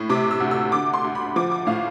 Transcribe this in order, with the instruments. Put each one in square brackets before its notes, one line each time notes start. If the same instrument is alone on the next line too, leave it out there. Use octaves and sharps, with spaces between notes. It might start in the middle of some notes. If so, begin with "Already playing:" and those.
Already playing: [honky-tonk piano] A2
C3 D6
E6
D2
E6
D3 D6
C6
D2
B5
F3 D6
D6
A2 F5